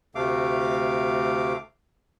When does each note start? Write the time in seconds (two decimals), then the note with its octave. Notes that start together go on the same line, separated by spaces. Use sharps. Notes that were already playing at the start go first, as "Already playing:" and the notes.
0.15 D2 C3 A3 F5 D6